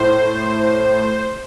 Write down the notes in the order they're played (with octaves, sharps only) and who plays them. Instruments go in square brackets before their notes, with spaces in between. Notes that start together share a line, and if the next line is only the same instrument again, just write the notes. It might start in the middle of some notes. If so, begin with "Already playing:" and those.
Already playing: [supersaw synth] A2 C5